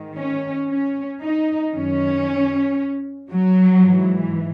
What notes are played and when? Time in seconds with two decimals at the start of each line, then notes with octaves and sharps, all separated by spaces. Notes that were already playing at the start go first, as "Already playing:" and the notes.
Already playing: G#2 D#3
0.17 C#4
0.69 C#4
1.21 D#4
1.74 F#2 D#3 C#4
3.31 F#3
3.83 G#2 E3